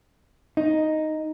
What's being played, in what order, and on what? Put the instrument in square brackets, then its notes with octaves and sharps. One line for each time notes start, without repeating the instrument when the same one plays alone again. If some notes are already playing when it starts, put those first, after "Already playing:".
[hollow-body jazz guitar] D#4